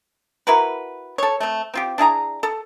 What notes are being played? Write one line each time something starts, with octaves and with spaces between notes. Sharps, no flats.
E4 F#4 A#4 B4
A4 C#5
A3 C4
C4 F4 G4
D4 E4 G#4 A#5
A4